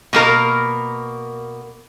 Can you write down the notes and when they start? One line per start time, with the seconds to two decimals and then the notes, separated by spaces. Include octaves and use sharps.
0.13 B2 A#3 A#4